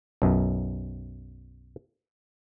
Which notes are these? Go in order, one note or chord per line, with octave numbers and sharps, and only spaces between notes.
B1 F#2